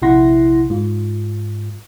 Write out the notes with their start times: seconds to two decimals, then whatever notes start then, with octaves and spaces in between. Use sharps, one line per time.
0.02 A#1 C3 E4 F#5 C6 A#6
0.70 G#2 F4